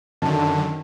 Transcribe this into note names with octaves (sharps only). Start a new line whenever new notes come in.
F#2 D3 D#3 A5